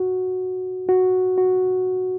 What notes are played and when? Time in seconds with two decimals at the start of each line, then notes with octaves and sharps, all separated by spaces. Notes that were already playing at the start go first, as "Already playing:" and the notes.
Already playing: F#4
0.89 F#4
1.38 F#4